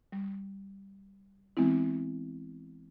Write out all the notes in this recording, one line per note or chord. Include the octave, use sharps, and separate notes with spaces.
G3
E3 G#3 B3 C4 E4